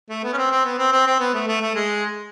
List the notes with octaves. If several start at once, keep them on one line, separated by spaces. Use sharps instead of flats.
A3
B3
C#4
C4
C4
B3
C4
C4
C4
B3
A3
A3
A3
G#3